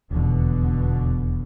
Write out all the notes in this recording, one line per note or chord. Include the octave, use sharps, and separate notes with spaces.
D#1 E2 B2 D3